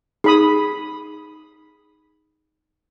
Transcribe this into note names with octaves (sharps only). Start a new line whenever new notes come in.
D#4 G#4 B5 D#6